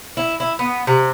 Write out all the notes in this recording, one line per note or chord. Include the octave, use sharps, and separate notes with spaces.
E4
E4
B3
C3